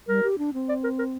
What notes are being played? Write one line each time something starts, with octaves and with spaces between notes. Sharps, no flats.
G3 A#4
G4
D4
C4
D5
A#4
A#4